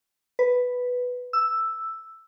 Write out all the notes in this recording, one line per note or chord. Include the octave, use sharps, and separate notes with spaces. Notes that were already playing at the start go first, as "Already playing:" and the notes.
B4
E6